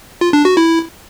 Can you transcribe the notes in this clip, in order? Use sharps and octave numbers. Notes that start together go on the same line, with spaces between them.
F4
D4
F#4
E4